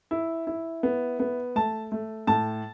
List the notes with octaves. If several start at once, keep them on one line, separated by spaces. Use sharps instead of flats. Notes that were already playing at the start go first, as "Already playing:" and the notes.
E4
E4
B3
B3
A3 A5
A3
A2 A5